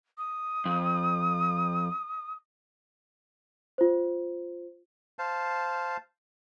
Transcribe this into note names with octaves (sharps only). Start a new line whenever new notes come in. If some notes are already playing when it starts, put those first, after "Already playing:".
D#6
F2
F4 C5
C5 F5 A5